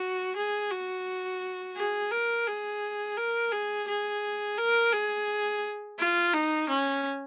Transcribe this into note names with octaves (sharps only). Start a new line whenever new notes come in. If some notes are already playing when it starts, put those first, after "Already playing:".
Already playing: F#4
G#4
F#4
G#4
A#4
G#4
A#4
G#4
G#4
A#4
G#4
F4
D#4
C#4